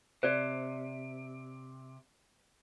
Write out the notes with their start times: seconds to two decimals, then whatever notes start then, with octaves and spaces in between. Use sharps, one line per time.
0.23 C3 C5 D5